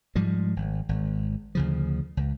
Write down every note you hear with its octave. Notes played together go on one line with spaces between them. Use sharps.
G#2 F3 G3 G#3
G#1
G#1
D2 C#3 F3
C#2